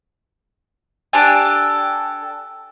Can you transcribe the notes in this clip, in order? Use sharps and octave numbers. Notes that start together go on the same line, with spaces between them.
D4 G4 A4 G#5